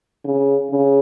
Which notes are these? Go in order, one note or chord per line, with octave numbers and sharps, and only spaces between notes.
C#3
C#3